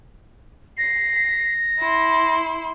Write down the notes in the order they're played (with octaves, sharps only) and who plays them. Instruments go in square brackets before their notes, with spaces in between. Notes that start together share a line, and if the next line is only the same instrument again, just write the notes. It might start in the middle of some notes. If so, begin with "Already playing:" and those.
[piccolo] A#6 [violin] C7
[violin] E4 C6